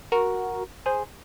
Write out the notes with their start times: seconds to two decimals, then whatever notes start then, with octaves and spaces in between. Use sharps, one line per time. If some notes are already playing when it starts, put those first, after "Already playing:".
0.12 F#4 A#4
0.86 G#4 C5